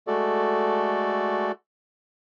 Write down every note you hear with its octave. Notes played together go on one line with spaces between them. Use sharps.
G#3 A3 F#4 A4 D5